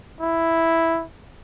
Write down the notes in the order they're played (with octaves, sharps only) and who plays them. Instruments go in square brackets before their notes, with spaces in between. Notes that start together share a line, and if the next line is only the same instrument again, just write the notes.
[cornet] E4